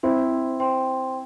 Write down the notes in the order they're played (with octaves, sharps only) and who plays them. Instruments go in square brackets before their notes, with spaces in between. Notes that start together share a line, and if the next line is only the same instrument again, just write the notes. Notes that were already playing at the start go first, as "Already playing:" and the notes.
[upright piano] C4 E4 [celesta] C5 G5 C6
[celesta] C5 G5 C6